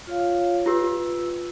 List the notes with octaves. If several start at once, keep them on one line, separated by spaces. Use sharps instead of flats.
F4 C#5 F5
F4 G4 B4 E6